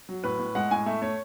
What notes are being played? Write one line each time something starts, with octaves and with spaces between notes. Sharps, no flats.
F#3
A2 B4
A2
G#3 F#5
A2 G#5
A3 E5
A3 C#5